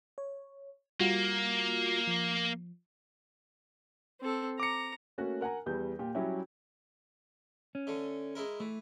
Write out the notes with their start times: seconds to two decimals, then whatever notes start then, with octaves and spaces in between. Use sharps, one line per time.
0.18 C#5
1.00 G3 A#3 F4 F#4
2.07 F3
4.20 C4 A4
4.60 A#5 D6 C#7
5.18 A3 A#3 C#4 F#4
5.41 A#4 F#5 G#5 A#5
5.66 E2 G3 B4 G6
5.99 A#2 G4
6.15 F#3 G3 C#4 E4 G4
7.75 C#4
7.87 D3 A3
8.35 G#3 E4 A#4
8.60 E3 A3